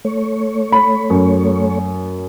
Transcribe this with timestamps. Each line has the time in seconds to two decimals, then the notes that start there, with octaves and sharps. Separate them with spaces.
0.05 A3 C#5
0.72 B5
1.10 F#2